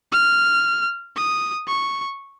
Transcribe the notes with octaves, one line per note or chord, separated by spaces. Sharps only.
F6
D#6
C#6